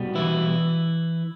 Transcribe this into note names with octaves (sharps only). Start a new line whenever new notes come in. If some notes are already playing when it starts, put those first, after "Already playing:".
Already playing: B2 G3 B3
E3 E4